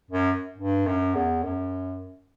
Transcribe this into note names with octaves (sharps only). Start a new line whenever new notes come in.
F#2
G2
F#2
E2
F#2